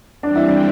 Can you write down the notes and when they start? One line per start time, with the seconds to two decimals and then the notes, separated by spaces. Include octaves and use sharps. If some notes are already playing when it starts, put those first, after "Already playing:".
0.23 E3 G3 C4 D4
0.36 E4
0.48 D4